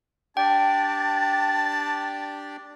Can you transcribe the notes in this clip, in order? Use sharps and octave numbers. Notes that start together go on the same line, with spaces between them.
D4 G4 D5 G5 A5